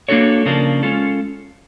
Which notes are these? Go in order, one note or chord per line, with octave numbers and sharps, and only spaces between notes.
A#3 D4 F#4 A4 C#5
C#3 F3 A#3 D4
G#3 C#4 F4 A4